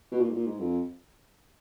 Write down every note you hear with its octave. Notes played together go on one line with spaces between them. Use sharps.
B2
A#2
G#2
A#2
G#2
F2